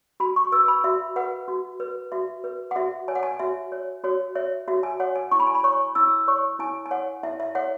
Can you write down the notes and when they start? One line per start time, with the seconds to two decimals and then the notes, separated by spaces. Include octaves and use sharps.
0.20 F#4 B5
0.36 C#6
0.52 B4 E6
0.68 B5
0.84 F#4 E5
1.16 B4 F#5
1.48 F#4
1.80 B4
2.12 F#4 E5
2.44 B4
2.71 F#5
2.76 F#4 E5
3.08 C#5 G#5
3.15 F#5
3.23 G#5
3.39 F#4 E5
3.72 C#5
4.04 F#4 C#5
4.35 C#5 E5
4.68 F#4 E5
4.83 G#5
5.00 C#5 F#5
5.16 G#5
5.31 E4 C#6
5.40 B5
5.47 G#5
5.55 B5
5.64 C#5 C#6
5.95 E4 E6
6.28 C#5 C#6
6.59 E4 G#5
6.86 G#5
6.91 C#5 F#5
7.23 E4 E5
7.40 E5
7.55 C#5 F#5